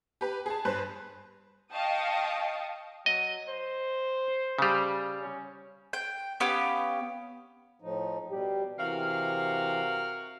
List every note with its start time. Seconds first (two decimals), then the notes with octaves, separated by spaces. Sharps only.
0.21 G4 B4
0.46 G#4 A5
0.65 G2 B4 C5 F#6
1.74 D#5 F5 G5 A5 C#6 D#6
3.06 F#3 D#5
3.48 C5
4.59 C#3 G3
5.20 C#4
5.93 G5
6.40 B3 C#4 G4 F5
7.82 A2 F3 D#4
8.31 B2 G3 G4
8.78 C3 E3 F#4 A#4 F5